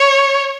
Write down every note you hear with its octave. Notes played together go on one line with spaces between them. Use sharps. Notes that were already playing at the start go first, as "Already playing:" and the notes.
Already playing: C#5